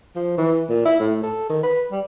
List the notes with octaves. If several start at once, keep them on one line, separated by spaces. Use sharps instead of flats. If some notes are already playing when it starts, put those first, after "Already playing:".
F3
E3
A#2
E4
A2
A4
D#3
B4
G3